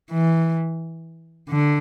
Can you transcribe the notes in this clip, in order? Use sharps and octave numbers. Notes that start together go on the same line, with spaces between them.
E3
D3